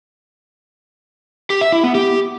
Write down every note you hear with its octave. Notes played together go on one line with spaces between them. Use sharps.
G4
E5
E4
B3
G4